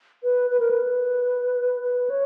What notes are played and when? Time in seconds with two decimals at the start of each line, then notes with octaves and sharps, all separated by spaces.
0.23 B4
0.50 B4
0.60 A#4
0.71 B4
1.83 B4
2.10 C#5